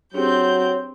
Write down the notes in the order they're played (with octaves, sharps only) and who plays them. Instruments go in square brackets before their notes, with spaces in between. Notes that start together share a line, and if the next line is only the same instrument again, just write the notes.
[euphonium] F#3 [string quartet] C4 G6 [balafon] D4 G4 G#4 [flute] C#5